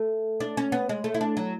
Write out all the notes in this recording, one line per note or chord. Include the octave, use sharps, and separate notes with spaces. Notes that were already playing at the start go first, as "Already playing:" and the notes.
Already playing: A3
D4
C#4
B3
G#3
A3
E4
D4
F#3